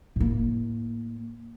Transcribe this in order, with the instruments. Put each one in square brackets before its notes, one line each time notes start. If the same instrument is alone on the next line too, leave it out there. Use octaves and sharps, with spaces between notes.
[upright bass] A2 A#3